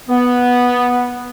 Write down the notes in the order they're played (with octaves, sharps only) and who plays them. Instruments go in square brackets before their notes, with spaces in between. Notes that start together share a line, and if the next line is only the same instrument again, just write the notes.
[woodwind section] B3